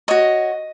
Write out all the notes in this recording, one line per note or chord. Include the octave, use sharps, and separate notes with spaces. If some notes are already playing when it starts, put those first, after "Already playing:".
F#4 C#5 D#5